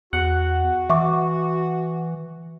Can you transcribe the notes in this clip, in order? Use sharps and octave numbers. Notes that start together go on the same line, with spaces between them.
E2 F#4 F#5
E3 E5 C#6 D6